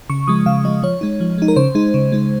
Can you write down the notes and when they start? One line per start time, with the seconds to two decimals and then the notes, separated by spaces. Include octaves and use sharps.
0.10 C#3 C#6
0.27 F3 G#3 D#6
0.46 C#3 F5
0.64 F3 G#3 D#5
0.83 F3 C#5
1.01 G#3 D#4
1.20 F3
1.38 G#3 D#4
1.48 A#4
1.56 C#3 C5
1.75 G#3 D#4
1.94 C#3
2.12 G#3 D#4